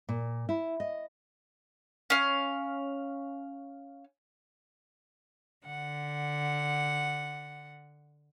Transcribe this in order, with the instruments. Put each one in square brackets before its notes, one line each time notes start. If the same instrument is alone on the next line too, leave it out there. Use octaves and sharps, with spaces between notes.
[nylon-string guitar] A#2
E4
D#5
[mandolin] C#4 F5
[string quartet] D3 F#5